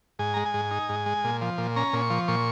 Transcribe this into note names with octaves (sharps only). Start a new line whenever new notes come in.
G#2 G#5
G#3 A#5
G#5
G#2
D#4
G#2
G#3
A#2
F3
A#2
C#4 A#5
A#2
C#6
F3
A#2 C#6